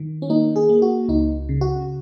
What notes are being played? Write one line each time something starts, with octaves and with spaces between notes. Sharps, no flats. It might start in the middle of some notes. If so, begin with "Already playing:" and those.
Already playing: D#3
C#4
A#3 D#4
G#4
A#3
F#4
C#2 D#4
C#3
F#4